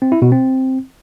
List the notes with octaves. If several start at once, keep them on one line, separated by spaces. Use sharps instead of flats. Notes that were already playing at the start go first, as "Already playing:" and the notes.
C4
E4
B2
C4